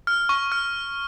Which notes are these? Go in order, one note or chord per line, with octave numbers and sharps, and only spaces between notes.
F6
C#6
F6